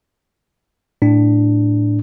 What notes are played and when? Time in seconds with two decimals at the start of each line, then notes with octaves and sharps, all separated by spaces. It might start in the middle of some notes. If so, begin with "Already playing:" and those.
1.02 A2 D4